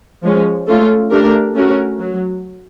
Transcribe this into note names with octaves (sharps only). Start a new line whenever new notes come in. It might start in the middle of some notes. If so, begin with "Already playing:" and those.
F3 G#3 C#4
A3 C#4 F4 A4
A3 D4 G4 A#4
A3 C#4 F#4 A#4
F#3